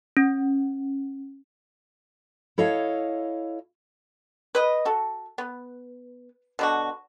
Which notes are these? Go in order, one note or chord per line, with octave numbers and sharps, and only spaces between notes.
C#4
E4 A4 C#5 D#5 F5
B4 D#5
F#4 A4
B3
B2 D3 F#4